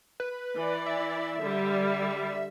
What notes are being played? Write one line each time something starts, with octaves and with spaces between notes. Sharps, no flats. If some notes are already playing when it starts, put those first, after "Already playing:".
B4
E3 D5
E5
D3 G3